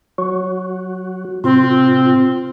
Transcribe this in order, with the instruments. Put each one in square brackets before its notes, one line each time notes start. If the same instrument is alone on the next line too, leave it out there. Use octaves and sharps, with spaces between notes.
[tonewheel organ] F#3 F#4
[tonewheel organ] A2 C3 F4 [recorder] C4